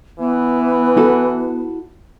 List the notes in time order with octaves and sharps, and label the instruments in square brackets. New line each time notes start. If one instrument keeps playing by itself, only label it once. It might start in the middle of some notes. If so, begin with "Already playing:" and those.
[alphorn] E3 [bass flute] B3
[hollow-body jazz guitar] E4 F#4 A4